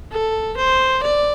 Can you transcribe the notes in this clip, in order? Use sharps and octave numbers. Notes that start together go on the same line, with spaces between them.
A4
C5
D5